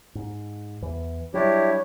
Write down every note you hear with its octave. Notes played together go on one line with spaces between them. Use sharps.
G#2
E2 E3
F#3 G3 D4 E4 G4 C#5